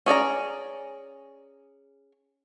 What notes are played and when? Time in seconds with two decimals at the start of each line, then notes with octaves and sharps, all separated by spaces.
0.06 C#4 G#4 D5 A#5